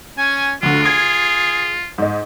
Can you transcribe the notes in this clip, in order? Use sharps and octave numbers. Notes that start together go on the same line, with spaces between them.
C#4 G#5
D2 D3 F4 F#4
G#4 G#6 D7
G#2 D#5